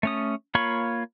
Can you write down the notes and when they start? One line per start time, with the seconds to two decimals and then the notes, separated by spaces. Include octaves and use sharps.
0.03 A3 C#4 D#6
0.55 A#3 F4 C#5 B5 C#6